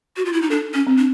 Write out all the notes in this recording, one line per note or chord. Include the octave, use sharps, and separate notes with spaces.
F#4
F4
E4
D#4
D4 A4
C#4
C4
D4